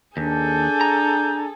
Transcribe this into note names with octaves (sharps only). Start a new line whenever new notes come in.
D#2 D4 G#4 A4 G6
A#5